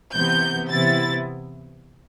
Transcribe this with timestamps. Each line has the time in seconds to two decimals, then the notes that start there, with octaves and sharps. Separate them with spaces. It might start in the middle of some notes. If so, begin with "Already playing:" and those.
0.15 C3 E3 B3 G6
0.70 C3 E3 B3 E4 A6